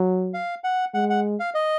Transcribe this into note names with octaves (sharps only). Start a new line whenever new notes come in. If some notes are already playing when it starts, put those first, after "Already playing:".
Already playing: F#3
F5
F#5
G#3 F#5
F#5
F5
D#5